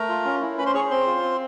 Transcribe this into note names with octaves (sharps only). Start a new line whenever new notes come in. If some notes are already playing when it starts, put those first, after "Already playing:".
Already playing: A3 A#4 A#5
F4
C#4
E4
C#4 B4 B5
C5 C6
G#4 C#5 C#6
C4 C5 C6
F4
C4